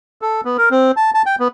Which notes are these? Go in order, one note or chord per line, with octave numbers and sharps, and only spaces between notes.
A4
B3
A#4
C4
A5
A5
G5
B3